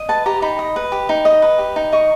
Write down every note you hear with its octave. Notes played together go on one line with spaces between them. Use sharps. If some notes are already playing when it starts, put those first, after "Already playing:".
Already playing: D#5
B4 A5
G4 A#5
D#4 B5
D#5
B4
G4
D#4
D#5
B4
G4
D#4
D#5 C#6